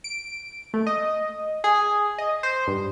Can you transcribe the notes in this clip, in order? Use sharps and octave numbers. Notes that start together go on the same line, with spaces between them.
D7
A3
D#5
G#4
D#5
C5
G2